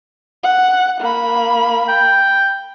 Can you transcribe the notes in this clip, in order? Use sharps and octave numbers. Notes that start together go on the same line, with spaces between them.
F#5
A#3 B5
G5